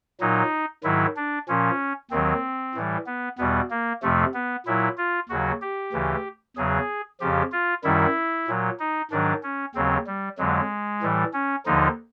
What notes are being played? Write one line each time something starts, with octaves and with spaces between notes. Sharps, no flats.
A#2 F#3 D#4
G#2 D#3 F#3 E4
D4
A#2 F3 C#4
D#2 D#3 F#3 C4
A2 E3 G3
B3
E2 B2 G3 B3
A#3
F2 C3 F3 A3
B3
A#2 F#3 E4
F4
D#2 C#3 F#3 F#4
G4
D2 C#3 E3
E2 C#3 F#3 G#4
F2 C#3 F3 G4
F4
F#2 D#3 G3 E4
A#2 F#3
D#4
G#2 D#3 F#3 D4
C#4
D#2 C#3 F#3 C4
G3
F2 D3 F#3 G#3
A2 E3 G3
C#4
D#2 D3 F3 D#4